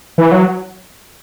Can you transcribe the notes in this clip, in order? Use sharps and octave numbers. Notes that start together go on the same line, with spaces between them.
E3
F#3